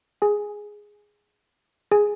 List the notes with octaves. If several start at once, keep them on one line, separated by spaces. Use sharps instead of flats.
G#4 G#5
G#4 G#5